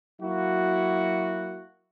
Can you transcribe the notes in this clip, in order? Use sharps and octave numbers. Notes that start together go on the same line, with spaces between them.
F#3 A#3 E4 F#4